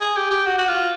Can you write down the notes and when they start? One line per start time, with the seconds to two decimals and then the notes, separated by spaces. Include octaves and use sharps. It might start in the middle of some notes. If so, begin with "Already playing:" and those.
0.01 G#4
0.16 G4
0.31 G4
0.46 F#4
0.58 F#4
0.68 F4